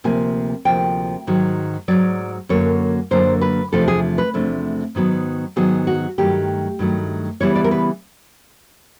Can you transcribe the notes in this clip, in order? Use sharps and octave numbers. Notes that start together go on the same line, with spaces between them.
D2 C3 F3 A#3 G#5
D2 C3 F3 A#3 G5
G#2 D#3 F#3
G#2 D#3 F#3 D5
F#2 D3 F#3 A#3 C#5
F#2 D3 F#3 A#3 C5
B4
E2 C3 F3 A3 D4 A4
G#4
B4
E2 C3 F3 A3 D4
G#2 D#3 F#3 B3
G#2 D#3 F#3 B3 G#4
F#4
G2 D#3 F#3 A3 G4
G2 D#3 F#3 A3
C#3 E3 G3 B3 E4 C#5
D5
A#4
B4